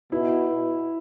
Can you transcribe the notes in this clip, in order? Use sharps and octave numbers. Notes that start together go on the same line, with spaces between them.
B2 E4